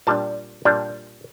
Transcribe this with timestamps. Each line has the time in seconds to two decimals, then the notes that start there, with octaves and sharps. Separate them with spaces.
0.07 A#2 G3 D4 A5
0.65 A#2 G3 D4